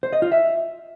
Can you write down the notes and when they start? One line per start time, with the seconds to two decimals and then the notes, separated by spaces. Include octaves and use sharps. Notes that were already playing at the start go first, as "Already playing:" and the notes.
0.03 C5
0.13 D#5
0.22 F4
0.32 E5